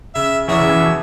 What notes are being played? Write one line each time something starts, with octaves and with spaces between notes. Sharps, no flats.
C#3 E5
E2 E3 G#4 C#5 E5
C#3
E2 E3
B2